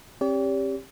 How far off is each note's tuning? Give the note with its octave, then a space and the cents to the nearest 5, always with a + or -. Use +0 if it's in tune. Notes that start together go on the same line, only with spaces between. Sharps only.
C4 +45 G4 +15 D5 -45